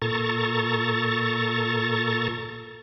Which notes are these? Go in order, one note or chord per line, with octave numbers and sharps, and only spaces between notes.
A#2 A4 A#5 C#6 A6